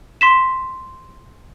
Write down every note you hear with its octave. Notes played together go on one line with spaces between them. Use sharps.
C6 B6 E7